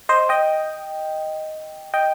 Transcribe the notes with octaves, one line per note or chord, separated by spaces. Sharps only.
C5 D#5
D#5 G5
D#5 G5